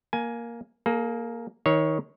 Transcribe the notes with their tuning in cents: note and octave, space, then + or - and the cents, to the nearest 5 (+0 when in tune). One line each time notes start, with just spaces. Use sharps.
A#3 +5 G#5 +15
A#3 +0 G#4 +45
D#3 +25 C#5 +0